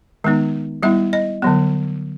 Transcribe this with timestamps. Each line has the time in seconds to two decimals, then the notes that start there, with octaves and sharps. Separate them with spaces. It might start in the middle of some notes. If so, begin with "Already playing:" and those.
0.24 D#3 G#3 B3 D#4
0.83 G3 B3 E4 E5
1.13 D#5
1.42 D3 F#3 B3